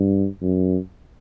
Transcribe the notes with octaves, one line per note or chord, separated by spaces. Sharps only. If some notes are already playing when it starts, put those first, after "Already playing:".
Already playing: G2
F#2